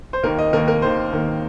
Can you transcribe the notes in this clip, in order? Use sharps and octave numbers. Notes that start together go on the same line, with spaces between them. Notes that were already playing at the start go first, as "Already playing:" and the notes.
C5
D#2 D#3 A#3 A#4
D#5
D#2 D#3 A#3 A#4
A#4
D#2 D#3 A#3 C5
D#2 D#3 A#3